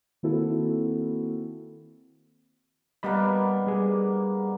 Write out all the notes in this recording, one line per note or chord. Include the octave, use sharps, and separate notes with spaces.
D#3 A#3 C4 E4 F#4 A4
G3 A#3 B3 D4 D#5 B5
G3 G#4